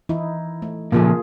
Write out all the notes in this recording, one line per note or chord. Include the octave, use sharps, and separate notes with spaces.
E3 D#4 E4
A3
A#2 C#3 F3 A#3 F4 G#4